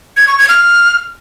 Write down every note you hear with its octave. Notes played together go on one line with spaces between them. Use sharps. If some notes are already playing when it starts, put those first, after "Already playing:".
G#6
C#6
G#6
F6